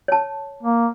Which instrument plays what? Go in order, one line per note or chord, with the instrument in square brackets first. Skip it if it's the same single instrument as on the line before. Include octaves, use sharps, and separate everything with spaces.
[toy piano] C#5 A5
[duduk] A#3